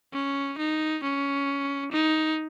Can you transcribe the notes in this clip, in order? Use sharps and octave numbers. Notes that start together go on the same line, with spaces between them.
C#4
D#4
C#4
D#4